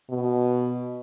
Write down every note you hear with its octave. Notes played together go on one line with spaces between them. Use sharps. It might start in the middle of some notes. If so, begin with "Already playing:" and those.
B2